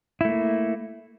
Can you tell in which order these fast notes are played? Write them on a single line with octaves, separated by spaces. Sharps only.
E4 A3 A#3